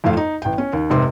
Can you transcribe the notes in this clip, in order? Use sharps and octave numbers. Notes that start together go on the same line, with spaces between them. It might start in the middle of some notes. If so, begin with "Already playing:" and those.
F2 A2 A3 F5
D#4
A1 G5
C#4
D#2
F1 G#2 C3 C6